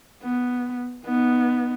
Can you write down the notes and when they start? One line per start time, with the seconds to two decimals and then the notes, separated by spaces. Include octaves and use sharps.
0.23 B3
1.06 B3 D#4